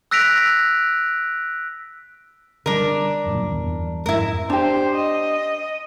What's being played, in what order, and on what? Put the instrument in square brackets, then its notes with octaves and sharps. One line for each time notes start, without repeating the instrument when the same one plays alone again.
[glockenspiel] E6 F#6 A#6 B6 D7 F7
[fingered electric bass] D3 G3 [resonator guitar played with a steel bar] D4 A#4
[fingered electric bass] F#1 F#2 A#2
E2 G2
[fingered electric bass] F2 G#2 G#3 [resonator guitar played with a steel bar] E4 A#4
[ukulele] D4 G4 [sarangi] C5
[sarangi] D#5